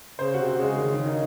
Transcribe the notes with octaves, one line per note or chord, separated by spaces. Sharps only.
C#3 C5
C3 F#4
F#4
C#3 G#3
D#3
D#3
D#4